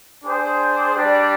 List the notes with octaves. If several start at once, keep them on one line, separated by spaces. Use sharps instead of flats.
D4 G#4 C5 G5
G3 D4 G4 D5